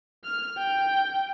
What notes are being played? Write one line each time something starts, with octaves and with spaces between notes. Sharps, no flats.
F6
G5